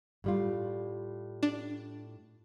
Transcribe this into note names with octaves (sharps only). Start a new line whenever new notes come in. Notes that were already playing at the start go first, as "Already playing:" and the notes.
A2 G3 F4
D4